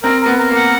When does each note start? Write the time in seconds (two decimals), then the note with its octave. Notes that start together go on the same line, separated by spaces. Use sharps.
0.03 C4 A#4
0.20 A#4
0.26 B3
0.37 A#4
0.49 A#3
0.56 F#5